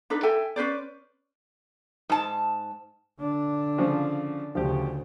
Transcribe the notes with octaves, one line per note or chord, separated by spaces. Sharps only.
D4 D#4 A4 B4
A4 E5 G5 G#5
C#4 B4 C5 D5
G#2 A5
D3 D4
C#3 F3
D2 C#3 F3 G4